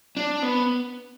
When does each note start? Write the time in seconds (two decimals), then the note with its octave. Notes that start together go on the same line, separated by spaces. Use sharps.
0.17 D4
0.43 B3